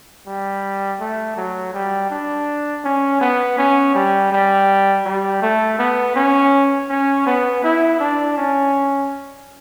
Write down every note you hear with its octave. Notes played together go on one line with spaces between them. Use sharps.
G3
A3
F#3
G3
D4
C#4
B3
C#4
G3
G3
G3
A3
B3
C#4
C#4
B3
E4
D4
C#4